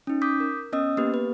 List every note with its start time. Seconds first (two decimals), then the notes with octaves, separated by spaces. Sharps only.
0.07 C#4 D#4
0.22 D6 D#6 G6 B6
0.40 A#4
0.72 B3 C#4 D#5 D#6 E6
0.97 A#3 B3 G4 B4
1.14 B4